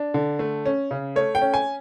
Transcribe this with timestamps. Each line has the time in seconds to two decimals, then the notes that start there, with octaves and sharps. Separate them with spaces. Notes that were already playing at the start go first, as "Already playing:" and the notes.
Already playing: D4
0.14 D3
0.39 A3
0.66 C#4
0.91 C#3
1.16 A3 C#5
1.35 G5
1.41 C#4
1.54 G#5